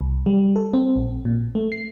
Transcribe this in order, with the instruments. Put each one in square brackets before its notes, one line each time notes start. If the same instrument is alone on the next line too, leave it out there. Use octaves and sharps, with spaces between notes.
[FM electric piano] C2
G3
A4
C4
A#1
A#2
A3
C7